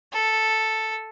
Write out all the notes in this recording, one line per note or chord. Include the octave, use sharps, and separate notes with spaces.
A4